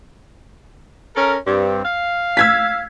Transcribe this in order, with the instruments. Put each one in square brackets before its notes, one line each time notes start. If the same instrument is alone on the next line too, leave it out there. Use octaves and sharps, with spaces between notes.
[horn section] C#4 A4 A#4
G2 C4
F5
[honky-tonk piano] E6 G#6 B6